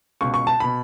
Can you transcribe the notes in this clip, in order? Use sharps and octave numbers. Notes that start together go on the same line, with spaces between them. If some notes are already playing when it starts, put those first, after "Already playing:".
C#2 B2 C#6
C#6
A5
B2 B5